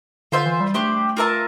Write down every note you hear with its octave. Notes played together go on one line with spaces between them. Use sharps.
D3 F4 C5 E5
E3
G3
A3 D4 G4 C5
F4 A#4 E5 A5